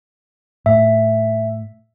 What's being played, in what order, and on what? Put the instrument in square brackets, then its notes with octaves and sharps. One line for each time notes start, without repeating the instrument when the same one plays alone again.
[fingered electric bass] A2 [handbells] E5